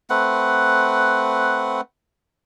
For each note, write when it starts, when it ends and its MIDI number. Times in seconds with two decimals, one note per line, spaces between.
0.10 1.81 57
0.10 1.81 60
0.10 1.81 71
0.10 1.81 78